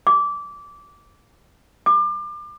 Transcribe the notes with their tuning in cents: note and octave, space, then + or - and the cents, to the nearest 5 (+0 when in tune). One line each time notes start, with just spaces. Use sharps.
D6 -20
D6 +30